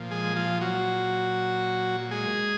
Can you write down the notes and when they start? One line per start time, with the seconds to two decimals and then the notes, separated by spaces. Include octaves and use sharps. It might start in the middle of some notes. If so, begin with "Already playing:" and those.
Already playing: A#2 F3
0.11 G#3 G#4
0.36 F3 F4
0.61 F#3 F#4
2.11 G#3 G#4